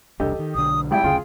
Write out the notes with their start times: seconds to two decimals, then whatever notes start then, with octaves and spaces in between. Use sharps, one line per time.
0.20 E1 C2 D4 G4 A4 D#5
0.39 D#3
0.55 B1 D3 D#6
0.91 G#1 G3 E4 G5
1.04 F#1 D2 C#3 F4 G#4